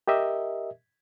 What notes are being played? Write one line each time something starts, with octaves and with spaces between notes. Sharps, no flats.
G4 A#4 D#5 E5